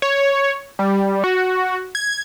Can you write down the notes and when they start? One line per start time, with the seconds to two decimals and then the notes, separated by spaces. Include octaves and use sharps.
0.02 C#5
0.79 G3
1.24 F#4
1.95 G#6